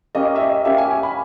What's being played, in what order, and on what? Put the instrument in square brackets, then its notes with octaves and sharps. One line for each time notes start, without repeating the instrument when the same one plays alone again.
[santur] A#3 C#4 G4 [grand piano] D#5
[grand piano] E5
D#5
[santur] A#3 C#4 G4 [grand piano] E5
[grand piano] G#5
G#5
B5